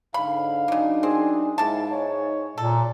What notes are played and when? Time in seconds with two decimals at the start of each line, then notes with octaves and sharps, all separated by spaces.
0.14 G#2 D3 F5 B5
0.68 F#2 C#3 A#3 D4 D#4
1.03 C4 G#4
1.58 G#2 A#3 E4 A5
1.91 C#5
2.58 A#2 A4